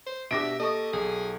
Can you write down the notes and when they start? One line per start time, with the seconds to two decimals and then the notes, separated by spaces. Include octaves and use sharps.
0.06 C5
0.31 B2 D4 G4 E5 D6 A#6 D7
0.60 A#3 A4 D#5 A5 C#6
0.93 B1 G#4